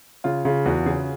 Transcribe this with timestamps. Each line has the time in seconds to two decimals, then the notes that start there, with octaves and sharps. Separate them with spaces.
0.24 C#3 F4
0.45 C#3 F4
0.66 E2 F#4
0.86 C#3 G#4